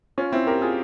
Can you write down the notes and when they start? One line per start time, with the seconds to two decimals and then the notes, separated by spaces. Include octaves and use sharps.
0.18 C#4 F4
0.32 C4 E4
0.47 G4 A#4
0.62 F4 G#4